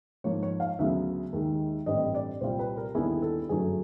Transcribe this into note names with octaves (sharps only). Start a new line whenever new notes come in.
G#2 F3 A#3 D#4 C#5
C#5
F5
D2 C#3 F#3 B3 E5
D#2 D#3 G#3
A1 G2 D3 G3 C4 D#5
D5
C2 A#2 G3 C4 F4 C5
B4
A#4
D#2 D3 G3 B3 E4 G#4
A4
G1 F#2 D3 F#3 A3 G#4